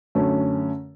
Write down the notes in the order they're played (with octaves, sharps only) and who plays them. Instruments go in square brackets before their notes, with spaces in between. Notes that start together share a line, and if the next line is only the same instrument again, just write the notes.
[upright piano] F#2 D3 A3 C#4